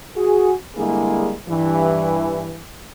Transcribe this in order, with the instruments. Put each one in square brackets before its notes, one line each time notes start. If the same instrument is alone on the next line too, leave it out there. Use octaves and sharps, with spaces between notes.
[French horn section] F#4 G#4
D3 G3 G#3 A#3 E4 G#4
G2 E3